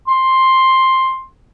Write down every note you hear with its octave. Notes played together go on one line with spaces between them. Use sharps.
C6